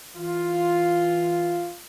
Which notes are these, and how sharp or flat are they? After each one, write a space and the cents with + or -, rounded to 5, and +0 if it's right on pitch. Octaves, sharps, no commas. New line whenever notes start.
E3 +0 F4 +0